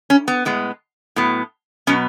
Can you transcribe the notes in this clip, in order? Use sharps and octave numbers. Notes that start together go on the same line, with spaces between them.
C#4
B3
A2 G#3 B3
A2 F#3 B3
B2 F#3 B3 C#4